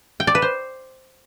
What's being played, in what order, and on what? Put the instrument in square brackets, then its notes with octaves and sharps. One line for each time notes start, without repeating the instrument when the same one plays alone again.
[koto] G5
D5
B4
C5